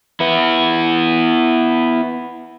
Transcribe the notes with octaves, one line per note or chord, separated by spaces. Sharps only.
B3 E4